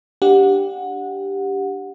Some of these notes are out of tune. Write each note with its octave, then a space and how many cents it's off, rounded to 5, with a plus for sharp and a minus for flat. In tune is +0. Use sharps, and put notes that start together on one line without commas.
D4 +5 G4 +0 F#5 -20